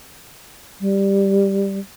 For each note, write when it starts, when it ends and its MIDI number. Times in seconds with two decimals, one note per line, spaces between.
0.81 1.79 55